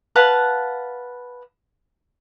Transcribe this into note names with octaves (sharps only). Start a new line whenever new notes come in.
B4 F5 F#5 A5